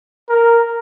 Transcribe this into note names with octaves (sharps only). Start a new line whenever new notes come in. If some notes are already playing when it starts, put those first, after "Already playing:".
A#4